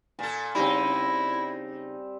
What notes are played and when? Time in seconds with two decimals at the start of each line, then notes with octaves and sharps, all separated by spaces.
0.19 A#2 A4 G#5
0.55 C#3 G3 C4 D#4 E4